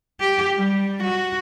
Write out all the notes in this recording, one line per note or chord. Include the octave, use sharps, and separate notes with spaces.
G4
G3
F#4